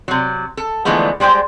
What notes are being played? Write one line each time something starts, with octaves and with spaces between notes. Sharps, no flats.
C3 F#3
A4
D3 E3 F3 G#3 A3 B3
G3 G#3 C5 G5